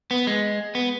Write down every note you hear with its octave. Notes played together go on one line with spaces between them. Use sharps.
B3
G#3
B3